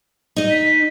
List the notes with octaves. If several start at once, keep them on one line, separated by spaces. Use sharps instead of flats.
D#4 D#5
B6